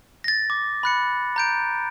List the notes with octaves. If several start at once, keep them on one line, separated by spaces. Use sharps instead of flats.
A6 A#6
D6
B5 F#6 C#7
A#5 G6 D7